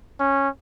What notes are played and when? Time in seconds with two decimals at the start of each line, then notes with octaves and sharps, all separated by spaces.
0.20 C#4